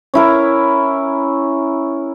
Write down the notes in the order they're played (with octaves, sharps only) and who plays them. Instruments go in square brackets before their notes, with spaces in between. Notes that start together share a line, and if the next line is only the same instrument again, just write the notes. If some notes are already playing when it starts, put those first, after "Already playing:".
[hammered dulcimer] C#4 E4 A#4